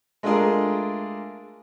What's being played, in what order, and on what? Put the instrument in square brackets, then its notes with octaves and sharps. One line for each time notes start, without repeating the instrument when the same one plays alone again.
[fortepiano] G#3 A3 D4 F4 G#4 A#4